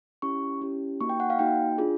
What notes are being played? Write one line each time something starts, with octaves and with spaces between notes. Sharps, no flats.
C#4 E4 G4 C#6
C#4 E4 G4
A#3 D#4 F#4 C#6
G5
F#5
F5
A#3 D#4 F#4 G5
D4 F4 G#4